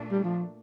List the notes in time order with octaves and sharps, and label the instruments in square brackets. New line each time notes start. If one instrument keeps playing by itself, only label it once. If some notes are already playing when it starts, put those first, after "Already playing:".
Already playing: [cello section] A#2 A3 D4
[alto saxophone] G3
F3